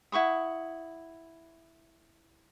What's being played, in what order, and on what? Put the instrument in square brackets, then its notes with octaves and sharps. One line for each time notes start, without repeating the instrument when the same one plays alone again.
[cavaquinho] E4 F#5 C#6 D#6